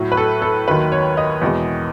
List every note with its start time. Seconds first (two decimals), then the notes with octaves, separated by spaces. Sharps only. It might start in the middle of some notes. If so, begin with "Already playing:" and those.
Already playing: A2 F#3
0.12 B4
0.17 A4
0.42 A4
0.68 D#2 D#3 F#3 B4
0.92 C#5
1.17 D#5
1.42 E2 B2 G#3